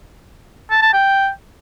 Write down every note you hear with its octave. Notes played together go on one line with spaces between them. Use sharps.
A5
A5
G5